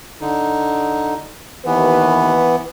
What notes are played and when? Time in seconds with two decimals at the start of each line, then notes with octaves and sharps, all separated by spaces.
0.21 D3 D#4
1.66 D#2 D#3 E3 B3 B4